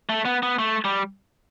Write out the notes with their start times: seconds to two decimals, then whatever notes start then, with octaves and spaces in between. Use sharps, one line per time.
0.09 A3
0.25 B3
0.43 B3
0.59 A3
0.85 G3